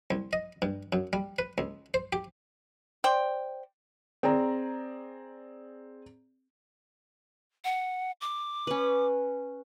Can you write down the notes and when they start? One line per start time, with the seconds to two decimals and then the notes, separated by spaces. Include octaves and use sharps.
0.11 C2
0.33 D#5
0.62 G2
0.93 F#2
1.13 G3
1.39 B4
1.58 C#2
1.94 C5
2.13 G4
3.04 C5 D5 G5
4.23 C4 G#4 D5 A#5
7.64 F#5
8.21 D6
8.67 C#4 B4